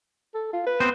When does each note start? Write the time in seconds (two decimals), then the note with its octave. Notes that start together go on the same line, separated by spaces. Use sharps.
0.34 A4
0.53 F4
0.66 B4
0.80 B3 C4 C5